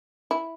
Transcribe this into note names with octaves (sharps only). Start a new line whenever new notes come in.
E4